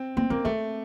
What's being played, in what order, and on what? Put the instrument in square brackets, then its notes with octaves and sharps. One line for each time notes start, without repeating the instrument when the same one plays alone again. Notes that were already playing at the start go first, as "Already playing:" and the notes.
Already playing: [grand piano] C4
[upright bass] A#3 [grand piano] C4
[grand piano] A#3 [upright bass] C4
[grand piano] A3 [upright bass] C4